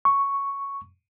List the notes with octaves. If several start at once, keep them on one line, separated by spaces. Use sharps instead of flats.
C#6